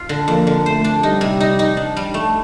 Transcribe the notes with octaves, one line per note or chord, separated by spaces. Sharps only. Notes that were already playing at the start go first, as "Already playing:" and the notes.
Already playing: F4
D3
F2 A#3
D3
A3 C5
D4
G3 D#4
C3
D#4
D#4
D4
G3
A3